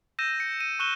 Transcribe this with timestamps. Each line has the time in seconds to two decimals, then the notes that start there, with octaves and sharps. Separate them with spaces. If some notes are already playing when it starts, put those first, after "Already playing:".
0.19 E6 G6 A#6 D#7 E7
0.40 C#7
0.60 D#7
0.79 C#6 E6 F#6 D#7 E7 G7